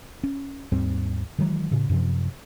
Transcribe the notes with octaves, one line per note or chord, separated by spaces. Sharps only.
C#4
D#2 G#2 G3 C4
D#3 E3 F#3 G#3
A2 C#3
F#2 C3 F3